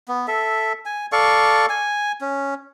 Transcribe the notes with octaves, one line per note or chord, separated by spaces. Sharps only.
B3
A4 E5
G#5
A4 D5 F5 C#6
G#5
C#4